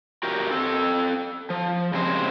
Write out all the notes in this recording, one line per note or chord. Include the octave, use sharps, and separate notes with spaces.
F#4 G4 A#4
C4 A4
F3
C#3 G3 G#3 A#3 C4 C5